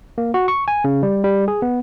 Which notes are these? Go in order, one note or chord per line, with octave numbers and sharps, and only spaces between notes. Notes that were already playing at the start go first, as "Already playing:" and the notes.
A#3
F#4
C#6
G#5
C#3
G3
G3
G#4
B3